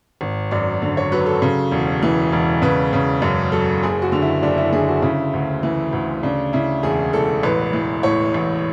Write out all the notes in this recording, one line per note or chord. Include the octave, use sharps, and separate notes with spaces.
G#1
F#2 D5
D3
C#5
F#3 B4
A4
C#3
E1
E3
E1
C#3 B4
C#3
F#2
F#3 A4
F#1 G#4
F#4
D3
E4
F#1 D4
E4
D3 G#4
F#4
C#3 E4
D2
E3
D2
C#3 D4
C#3 E4
E1 G#4
E1 A4
A1 B4
E3
A2 C#5
A1